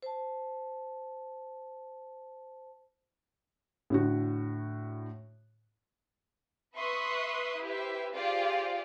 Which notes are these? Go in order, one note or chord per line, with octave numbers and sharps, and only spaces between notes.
C5 A5
A2 D3 F#4
B4 E5 C6 C#6 D#6 F#6
E4 G4 B4 C5 E5
F4 G4 G#4 C5 D5 F5